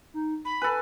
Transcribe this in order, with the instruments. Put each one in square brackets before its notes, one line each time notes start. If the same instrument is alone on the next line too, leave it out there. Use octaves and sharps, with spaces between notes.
[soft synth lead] D#4
[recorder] B5 [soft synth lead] B6
[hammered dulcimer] A4 B4 [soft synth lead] G#5